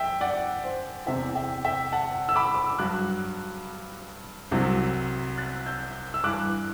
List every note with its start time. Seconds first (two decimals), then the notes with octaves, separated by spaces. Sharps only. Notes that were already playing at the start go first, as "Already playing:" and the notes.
Already playing: F#2 E5 G5
0.21 D5 F#5
0.64 C5
1.06 E2 C3 E3 C5 E5
1.35 E5 G5
1.64 E5 G5
1.92 F#5 A5
2.29 E6
2.36 B5 D6
2.54 D6
2.66 E6
2.78 G2 F#3 D6 F#6
4.51 C2 C3 F#3
5.38 F#6 A6
5.66 E6 G6
6.14 E6
6.24 G2 E3 D6 F#6